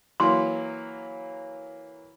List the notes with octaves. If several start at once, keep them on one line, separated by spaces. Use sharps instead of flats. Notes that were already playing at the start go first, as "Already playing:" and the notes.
E3 F#3 A#3 C6